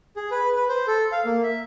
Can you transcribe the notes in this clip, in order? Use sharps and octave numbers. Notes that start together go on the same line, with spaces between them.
G#4
B4
B4
C5
A4
F5
A#3
E5